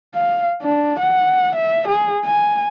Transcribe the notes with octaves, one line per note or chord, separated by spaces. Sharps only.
F5
D4
F#5
E5
G#4
G#5